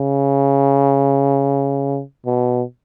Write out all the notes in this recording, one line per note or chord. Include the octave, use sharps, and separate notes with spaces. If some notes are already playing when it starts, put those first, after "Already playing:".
Already playing: C#3
B2